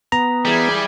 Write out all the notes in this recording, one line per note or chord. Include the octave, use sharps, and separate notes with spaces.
B3 A#5
E3 G3 G#4 G#5